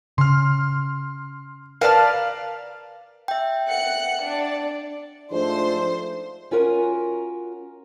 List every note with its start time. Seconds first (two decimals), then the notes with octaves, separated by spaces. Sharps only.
0.18 C#3 C6 F6
1.81 A#4 B4 D5 F5 A5 F6
3.28 E5 G5
3.67 F#5 F#6 C#7
4.23 D4 D5
5.32 G#2 F3 A3 D4 C5 C6
6.51 C#4 F4 F#4 A#4 G5 G#5